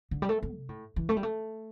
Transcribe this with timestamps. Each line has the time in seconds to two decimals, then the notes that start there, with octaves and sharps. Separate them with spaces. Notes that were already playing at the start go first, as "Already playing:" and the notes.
0.11 D3
0.22 G3
0.29 A3
0.43 C4
0.55 C3
0.69 A2
0.96 E3
1.09 A3
1.17 G3
1.23 A3